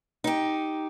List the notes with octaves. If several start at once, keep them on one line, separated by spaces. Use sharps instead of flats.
D#4 G4